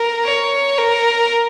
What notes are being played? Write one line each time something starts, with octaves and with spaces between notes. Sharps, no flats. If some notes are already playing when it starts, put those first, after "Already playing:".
Already playing: A#4
C#5
A#4